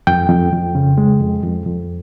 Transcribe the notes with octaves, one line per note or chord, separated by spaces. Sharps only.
F2 G5
F2
F2
C#3
G#3
F2
F2
F2